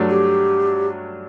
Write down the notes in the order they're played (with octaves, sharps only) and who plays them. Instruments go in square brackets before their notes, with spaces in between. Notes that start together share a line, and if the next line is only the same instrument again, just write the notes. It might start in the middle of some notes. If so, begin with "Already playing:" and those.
Already playing: [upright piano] G2 F#3 A3 D4 F#4
[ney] G4